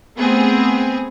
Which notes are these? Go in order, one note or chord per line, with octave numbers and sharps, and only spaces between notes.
A3 B3 C4 G#4